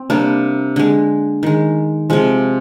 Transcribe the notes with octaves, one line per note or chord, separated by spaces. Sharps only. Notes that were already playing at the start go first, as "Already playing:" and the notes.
Already playing: C4
C3 G3 A#3 D4
D3 G#3
D#3 G#3
C3 F3 G#3